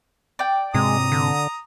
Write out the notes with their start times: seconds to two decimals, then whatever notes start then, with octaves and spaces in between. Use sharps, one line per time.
0.39 D5 G5
0.74 G#2 C3 G#3 C4 A#5 D#6
1.12 D3